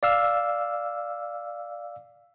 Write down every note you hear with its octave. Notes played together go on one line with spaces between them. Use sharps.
D5 F5 E6